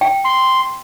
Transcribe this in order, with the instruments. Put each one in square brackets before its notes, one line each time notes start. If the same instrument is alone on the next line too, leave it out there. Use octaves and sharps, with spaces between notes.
[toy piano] G5
[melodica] C6